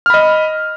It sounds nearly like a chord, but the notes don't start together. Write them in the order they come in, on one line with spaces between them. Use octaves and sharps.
F6 B5 D#5